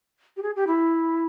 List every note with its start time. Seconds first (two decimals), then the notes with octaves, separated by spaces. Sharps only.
0.37 G4
0.42 G#4
0.56 G4
0.67 E4